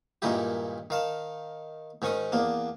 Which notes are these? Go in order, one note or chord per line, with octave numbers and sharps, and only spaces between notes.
G2 A#2 D#3 G#3 E4 G4
D#3 F5 A5
G#2 D#3 C#4 C#6 D#6
E2 A#3 D4